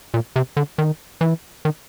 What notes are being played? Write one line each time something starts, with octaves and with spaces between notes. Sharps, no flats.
A#2
C3
D3
D#3
E3
D#3